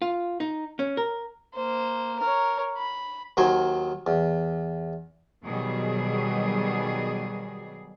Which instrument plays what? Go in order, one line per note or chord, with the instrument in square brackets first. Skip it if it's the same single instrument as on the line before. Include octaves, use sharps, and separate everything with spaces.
[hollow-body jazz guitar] F4
D#4
C#4
A#4
[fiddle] A#3 C5
A#4 C#5
B5
[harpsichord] D#2 D#3 F#3 C5 G#5
E2
[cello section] B2 D#3 F#3 G3 G#4